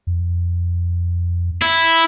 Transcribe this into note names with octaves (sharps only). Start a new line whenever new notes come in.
F2
E4